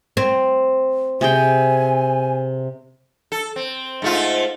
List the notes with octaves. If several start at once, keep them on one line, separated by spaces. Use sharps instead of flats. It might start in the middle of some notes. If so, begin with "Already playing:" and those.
C4
C3 G#4 G5 G#5
A4
C4
G#2 A3 F4